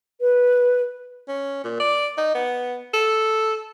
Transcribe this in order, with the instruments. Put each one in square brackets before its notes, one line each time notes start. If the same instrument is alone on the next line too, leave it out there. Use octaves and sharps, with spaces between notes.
[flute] B4
[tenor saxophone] C#4
A#2
D5
D#4
B3
A4